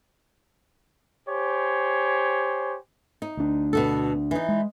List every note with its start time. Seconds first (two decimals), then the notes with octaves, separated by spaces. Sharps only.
1.28 G4 C5 C#5 G#5
3.22 D#4
3.37 D2 D4
3.73 B2 F#4 A4
4.31 E3 D#4
4.49 G#3